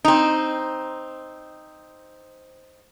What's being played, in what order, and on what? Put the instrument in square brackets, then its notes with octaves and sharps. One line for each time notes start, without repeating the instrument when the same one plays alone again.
[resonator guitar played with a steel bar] C4 D#4